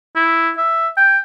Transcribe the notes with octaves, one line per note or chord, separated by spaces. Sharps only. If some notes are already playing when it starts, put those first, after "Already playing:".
E4
E5
G5